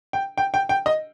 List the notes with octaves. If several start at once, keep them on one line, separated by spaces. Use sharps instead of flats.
G5
G5
G5
G5
D#5